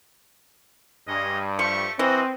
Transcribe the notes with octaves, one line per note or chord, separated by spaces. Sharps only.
G2 G#3 C#4 D#5
F3 A3 G4 C#6
E3 C4 F#4 D#5